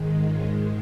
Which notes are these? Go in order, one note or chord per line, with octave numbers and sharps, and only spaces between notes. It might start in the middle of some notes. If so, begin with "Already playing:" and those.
Already playing: G#2 D#3 G#3
C#4 F4